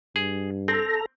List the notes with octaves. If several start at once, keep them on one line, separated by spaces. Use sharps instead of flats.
G2 G#4
C4 A4 A#5